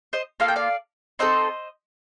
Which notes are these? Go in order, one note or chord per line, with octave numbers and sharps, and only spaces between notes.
C5 D#5
A#3 F4 A4 F5
G5
D5 F5
C4 D#4 A4 C5 D#5